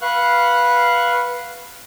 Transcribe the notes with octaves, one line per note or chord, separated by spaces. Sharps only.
B4 F5 F#5 C#6 F#6